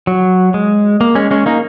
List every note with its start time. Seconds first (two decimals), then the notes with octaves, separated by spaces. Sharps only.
0.07 F#3
0.54 G#3
1.01 A#3
1.15 G#3 C#4
1.31 G#3 C#4
1.46 A#3 D#4